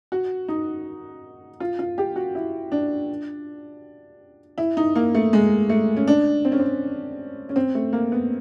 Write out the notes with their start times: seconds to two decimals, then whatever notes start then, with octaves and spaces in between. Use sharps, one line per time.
0.12 F#4
0.48 D#4
1.60 F4
1.79 F4
1.98 G4
2.16 F#4
2.35 E4
2.72 D4
4.58 E4
4.77 D#4
4.96 A#3
5.15 A3
5.33 G#3
5.70 A3
5.97 C#4
6.08 D4
6.45 C4
6.52 C#4
6.59 C4
7.49 C#4
7.56 C4
7.75 A3
7.93 A#3
8.12 B3